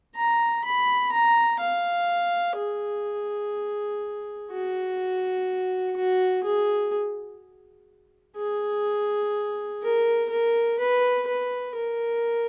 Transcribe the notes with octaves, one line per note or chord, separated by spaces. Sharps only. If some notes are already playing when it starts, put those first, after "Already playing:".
A#5
B5
A#5
F5
G#4
F#4
F#4
G#4
G#4
A#4
A#4
B4
B4
A#4